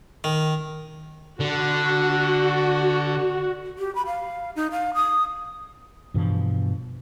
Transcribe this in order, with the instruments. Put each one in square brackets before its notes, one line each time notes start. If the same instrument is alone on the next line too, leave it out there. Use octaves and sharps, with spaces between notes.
[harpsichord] D#3
[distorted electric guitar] D3 [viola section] F#4
[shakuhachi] G4
B5
F5
D#4
F5
D#6
[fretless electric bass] G2 B2 E3 F3